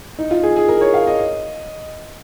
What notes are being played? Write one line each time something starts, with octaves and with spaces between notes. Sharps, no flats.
D#4
F4
G#4
G#4
A#4
C#5
F5
D#5